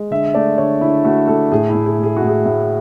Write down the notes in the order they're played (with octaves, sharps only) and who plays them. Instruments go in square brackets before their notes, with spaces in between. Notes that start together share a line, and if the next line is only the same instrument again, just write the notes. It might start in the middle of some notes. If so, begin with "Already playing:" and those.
Already playing: [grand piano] G#3
D3 E5
A3 D5
D3 C#5
D3 E4
A3 F#4
A3 A4
A2 G#4
E4
A2
G#4
A3 G#4
F#4
A2
G#4
A2